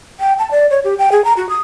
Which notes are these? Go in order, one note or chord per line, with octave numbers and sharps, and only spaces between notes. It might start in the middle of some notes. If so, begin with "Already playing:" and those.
G5
A5
D5
C#5
G4
G5
G#4
A#5
F#4
D#6